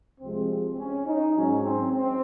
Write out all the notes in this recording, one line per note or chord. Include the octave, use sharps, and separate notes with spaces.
C2 C3 F3 G#3 C4
C4
C#4
D#4
G#2 F#3 C#4
C4
C4